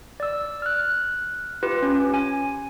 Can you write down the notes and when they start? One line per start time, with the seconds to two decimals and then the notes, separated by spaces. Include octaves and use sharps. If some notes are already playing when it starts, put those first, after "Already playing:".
0.20 D5 E6
0.62 F6 F#6
1.63 F4 G4 B4
1.82 C#4
2.14 G#5